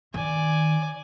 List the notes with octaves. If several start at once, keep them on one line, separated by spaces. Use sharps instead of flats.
D#3 D5 G#5